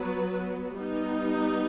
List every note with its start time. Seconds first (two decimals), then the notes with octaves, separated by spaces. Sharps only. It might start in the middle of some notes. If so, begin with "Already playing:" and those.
Already playing: F#3 B3 F#4 B4
0.79 G3 B3 D#4